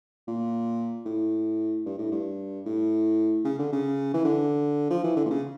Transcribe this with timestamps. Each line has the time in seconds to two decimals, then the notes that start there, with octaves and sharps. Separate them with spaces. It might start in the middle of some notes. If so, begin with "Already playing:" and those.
0.27 A#2
1.06 A2
1.86 G2
1.98 A2
2.12 G2
2.66 A2
3.45 C#3
3.59 D3
3.73 C#3
4.14 E3
4.25 D3
4.90 F3
5.04 E3
5.16 D3
5.25 A#2
5.30 C#3